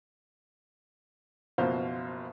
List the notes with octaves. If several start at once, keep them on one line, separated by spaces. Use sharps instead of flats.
F#1 B2 F3 C5 F5